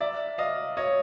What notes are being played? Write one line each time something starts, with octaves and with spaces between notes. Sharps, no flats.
D5 E5
D#5 F5
C#5 D#5